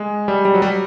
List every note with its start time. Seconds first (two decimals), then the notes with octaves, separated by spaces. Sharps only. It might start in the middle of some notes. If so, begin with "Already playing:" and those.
Already playing: G#3
0.28 G3
0.45 G3
0.54 F#3
0.62 G3